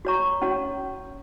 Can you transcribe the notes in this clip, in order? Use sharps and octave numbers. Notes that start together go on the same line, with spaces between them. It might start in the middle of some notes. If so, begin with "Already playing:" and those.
F#4 C#5 A#5 C#6
C#4 F#4 C#5